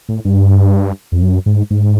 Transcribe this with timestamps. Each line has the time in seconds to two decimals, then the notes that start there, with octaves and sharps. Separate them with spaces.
0.09 A2
0.25 G2
1.12 F2
1.22 F#2
1.46 G#2
1.70 G#2